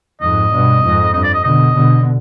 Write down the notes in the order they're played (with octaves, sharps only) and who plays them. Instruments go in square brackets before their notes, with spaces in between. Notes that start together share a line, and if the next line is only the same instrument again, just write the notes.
[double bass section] F2 G#2 [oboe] D#5
[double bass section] G2 B2
F2 G#2
[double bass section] G2 [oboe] D#5
[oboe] D5
D#5
[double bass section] B2 D3 [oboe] D#5
[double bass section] B2 D3